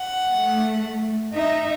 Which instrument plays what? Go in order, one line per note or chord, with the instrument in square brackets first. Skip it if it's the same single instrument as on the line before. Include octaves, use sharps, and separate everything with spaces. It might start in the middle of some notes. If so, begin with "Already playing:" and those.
Already playing: [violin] F#5
[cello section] A3
[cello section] D#4 [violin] E5